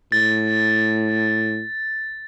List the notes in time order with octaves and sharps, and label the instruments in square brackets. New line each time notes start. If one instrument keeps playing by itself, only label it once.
[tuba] A2 [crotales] A6